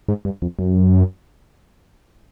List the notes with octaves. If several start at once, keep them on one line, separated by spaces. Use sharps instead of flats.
G#2
G2
F2
F#2